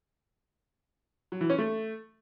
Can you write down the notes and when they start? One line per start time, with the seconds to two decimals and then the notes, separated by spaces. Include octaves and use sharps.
1.32 F#3
1.41 E3
1.50 C#4
1.58 A3